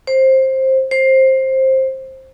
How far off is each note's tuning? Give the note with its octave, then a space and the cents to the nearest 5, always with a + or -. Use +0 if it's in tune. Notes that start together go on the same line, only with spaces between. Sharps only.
C5 +15
C5 +15